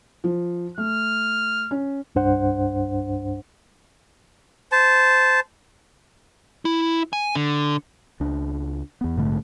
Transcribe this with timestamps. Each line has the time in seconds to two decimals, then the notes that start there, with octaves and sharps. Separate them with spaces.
0.24 F3
0.78 A3 F6
1.71 C#4
2.15 C2 G2 D4 C5 F#5
4.72 C5 A5
6.65 E4
7.13 G#5
7.35 D3
8.20 C#2 D4
9.01 E2 B3
9.17 A#1 G#2 D3 A3